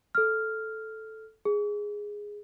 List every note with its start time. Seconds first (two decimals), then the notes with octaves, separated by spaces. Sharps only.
0.15 A4 F6
1.45 G#4